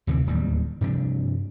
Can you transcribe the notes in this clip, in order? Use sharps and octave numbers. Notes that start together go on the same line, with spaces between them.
D2 C3 D#3 E3
D1 D#2 G3
G2 C3 F3 D4